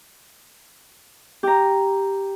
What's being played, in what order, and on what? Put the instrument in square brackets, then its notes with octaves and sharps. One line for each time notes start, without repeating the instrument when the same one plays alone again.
[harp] G4 A#5